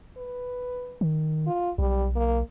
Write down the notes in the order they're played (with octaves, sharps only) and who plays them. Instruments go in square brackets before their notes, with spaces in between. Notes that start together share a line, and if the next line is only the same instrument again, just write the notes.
[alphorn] B4
[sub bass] D#3
[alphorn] F4
[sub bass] B1 [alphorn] G3
[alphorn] A#3